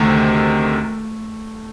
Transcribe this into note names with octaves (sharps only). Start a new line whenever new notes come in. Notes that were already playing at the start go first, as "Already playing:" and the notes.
Already playing: D2 C3 D#3 A3